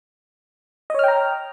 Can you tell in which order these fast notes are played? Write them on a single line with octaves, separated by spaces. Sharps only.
D#5 C#5 F6 G5 A#5